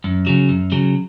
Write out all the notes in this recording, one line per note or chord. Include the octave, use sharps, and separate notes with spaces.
F#2
C#3 F#3
F#2
C#3 F#3